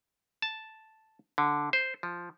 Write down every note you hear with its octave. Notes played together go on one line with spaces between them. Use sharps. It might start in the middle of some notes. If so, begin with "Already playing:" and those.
A5
D3
C5
F3